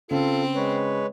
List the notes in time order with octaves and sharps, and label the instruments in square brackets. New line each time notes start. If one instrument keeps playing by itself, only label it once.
[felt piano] C#3 [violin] C4 [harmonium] F4 A4
[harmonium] G#3 B4 C#5